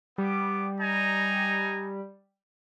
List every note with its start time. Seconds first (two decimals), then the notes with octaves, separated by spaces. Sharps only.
0.18 G3 B3 D6
0.79 D#4 G#5 A#5